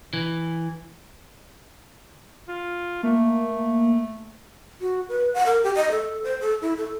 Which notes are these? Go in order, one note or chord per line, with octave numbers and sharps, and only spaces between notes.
E3
F4
A3 A#3
F#4
B4
F#5
A#4
G4
D#5
A4
C5
A4
E4
A4